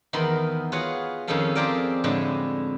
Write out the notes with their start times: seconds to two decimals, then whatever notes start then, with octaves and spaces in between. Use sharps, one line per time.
0.13 E2 D#3 B3 A#4 B5 C6
0.72 F4 F#4 G#4 B4 C#5
1.27 F2 D#3 C#4 G#4 A4 F5
1.55 C4 F4 G4 G#4 A#4 D5
2.04 F2 A2 D3 G#3